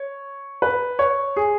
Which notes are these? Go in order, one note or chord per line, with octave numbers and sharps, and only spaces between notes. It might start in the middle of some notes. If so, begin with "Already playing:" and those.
Already playing: C#5
B4
C#5
G#4